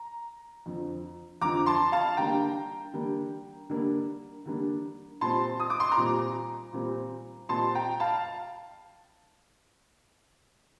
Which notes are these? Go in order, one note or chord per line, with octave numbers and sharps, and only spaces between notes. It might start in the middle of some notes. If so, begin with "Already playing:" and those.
Already playing: A#5
F2 D3 F3
F2 D3 F3 A#5 D6
A5 C6
F5 A5
D3 G3 A#3 D4 G5 A#5
D3 G3 A#3 D4
D3 G3 A#3 D4
D3 G3 A#3 D4
A#2 G3 C4 A5 C6
D#6
D6
C6
A#5 D6
A#2 G3 C4
A#2 G3 C4
A#2 G3 C4 A5 C6
G5 A#5
F5 A5